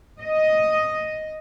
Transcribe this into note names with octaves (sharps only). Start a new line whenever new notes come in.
D#5